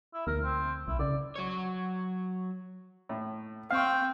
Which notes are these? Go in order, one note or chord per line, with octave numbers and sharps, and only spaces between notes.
E4
D2 A#4
C4
B1 E4
C#3 D5
F#3 C#5
A2
C4 F5 G5 C#6